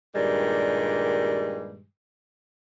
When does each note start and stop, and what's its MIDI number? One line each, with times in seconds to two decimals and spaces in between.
0.15 1.84 43
0.15 1.84 46
0.15 1.84 51
0.15 1.84 55
0.15 1.84 56